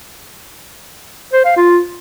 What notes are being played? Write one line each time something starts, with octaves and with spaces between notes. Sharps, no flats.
C5
F5
F4